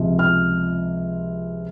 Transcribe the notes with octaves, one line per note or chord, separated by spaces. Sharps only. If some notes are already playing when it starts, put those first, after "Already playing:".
Already playing: C#2 C3 F3
F6